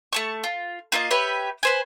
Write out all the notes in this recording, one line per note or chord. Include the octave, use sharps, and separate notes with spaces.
A3 A5 C#6
F4
A#3 F4 A4 D#5
G4 B4 C#5 E5
B4 C5 G#5